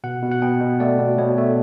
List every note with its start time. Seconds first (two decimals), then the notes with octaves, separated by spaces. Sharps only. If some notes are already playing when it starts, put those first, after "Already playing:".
0.04 B2 F#5
0.23 B2
0.31 F#5
0.42 B2 G5
0.61 B2
0.80 A3 D5
0.99 B2
1.18 B2 C#5
1.37 A3